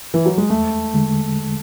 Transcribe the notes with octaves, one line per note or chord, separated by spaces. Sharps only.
E3
F#3
G#3
E2 A3
D3 G#3